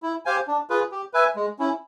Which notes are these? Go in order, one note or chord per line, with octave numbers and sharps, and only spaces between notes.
E4
G4 C5 F5 G#5
D4
F4 G#4 B4
G4
B4 E5 G#5
G#3
C#4 E4